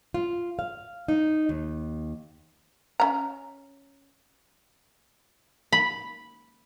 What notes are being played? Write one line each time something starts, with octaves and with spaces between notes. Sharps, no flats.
F4
F5
D#4
D#2
C#4 A#5
B5